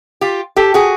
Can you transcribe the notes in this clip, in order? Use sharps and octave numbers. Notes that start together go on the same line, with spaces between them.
F4 G4
G4 A4
F#4 G#4